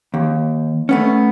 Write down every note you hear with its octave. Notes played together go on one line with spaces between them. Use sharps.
D#2
A3 B3 C#4